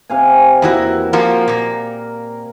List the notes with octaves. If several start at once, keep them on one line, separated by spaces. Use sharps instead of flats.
C3 F5 G#5
E2 A#3 E4 F#4
F3 A#3 F#4 A#4
A#2 A#3